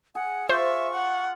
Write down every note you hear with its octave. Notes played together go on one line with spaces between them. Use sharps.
G#4 F#5
F4 C5 E5 C#6 D6
F#5